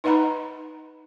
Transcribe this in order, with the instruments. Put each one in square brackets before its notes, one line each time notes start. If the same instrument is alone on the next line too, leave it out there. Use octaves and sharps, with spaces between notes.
[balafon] D#4 B4 D#5 F#5 A#5 B5